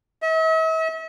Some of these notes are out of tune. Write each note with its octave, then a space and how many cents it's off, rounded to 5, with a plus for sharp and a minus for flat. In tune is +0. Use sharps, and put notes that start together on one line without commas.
E5 -45